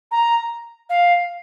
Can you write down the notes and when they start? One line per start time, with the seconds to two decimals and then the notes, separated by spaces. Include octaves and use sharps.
0.11 A#5
0.90 F5